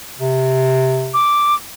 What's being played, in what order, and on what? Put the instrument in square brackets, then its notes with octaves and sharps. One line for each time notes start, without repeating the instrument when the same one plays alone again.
[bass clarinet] C3
[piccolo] D6